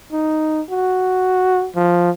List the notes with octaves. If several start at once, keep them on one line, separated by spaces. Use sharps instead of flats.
D#4
F#4
F3